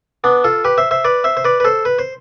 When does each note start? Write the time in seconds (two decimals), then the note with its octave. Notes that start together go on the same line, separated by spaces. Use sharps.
0.24 B3 D4
0.44 F4 A4
0.64 G4 B4
0.78 C5 E5
0.91 C5 E5
1.05 B4 D5
1.24 C5 E5
1.37 C5
1.45 B4 D5
1.60 B4
1.65 A4 C5
1.85 B4
1.99 C5